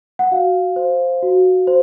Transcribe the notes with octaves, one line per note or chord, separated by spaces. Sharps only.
F#5
F#4 F5
C5
F#4
C5